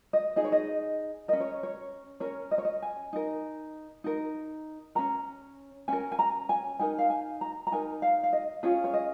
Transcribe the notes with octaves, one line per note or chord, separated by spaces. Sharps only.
D#5
D#4 G#4 D#5
C#5
D#5
C#4 A#4 D#5
C#5
C#5
C#4 A#4 C#5
D#5
C#5
D#5
G#5
D#4 A#4
D#4 A#4
C#4 A#4 A#5
C#4 A#4 G#5
G#5
A#5
G#5
D#4 A#4 G#5
F5
G#5
A#5
A#5
D#4 A#4 G#5
F5
F5
D#5
C#4 F4 G#4 C#5
C#5
D#5